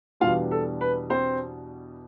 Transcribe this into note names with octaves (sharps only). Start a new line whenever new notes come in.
E2 B2 G3 D4 F4 F5
A4
B4
C4 C5